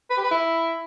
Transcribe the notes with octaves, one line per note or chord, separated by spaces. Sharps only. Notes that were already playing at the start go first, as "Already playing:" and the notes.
B4
G4
B4
E4